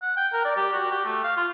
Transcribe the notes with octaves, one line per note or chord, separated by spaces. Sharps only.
F#5
G5
A#4
D5
G4
F#4
G4
A3
F5
F4